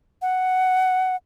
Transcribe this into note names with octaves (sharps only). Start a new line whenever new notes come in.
F#5